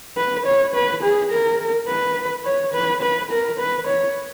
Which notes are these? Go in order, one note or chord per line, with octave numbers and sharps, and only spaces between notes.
B4
C#5
B4
G#4
A#4
B4
C#5
B4
B4
A#4
B4
C#5